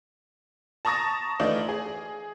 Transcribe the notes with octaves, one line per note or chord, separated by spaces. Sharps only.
A5 A#5 C#6 D#6 A6 A#6
E3 A3 D#4 F4 D5
G#4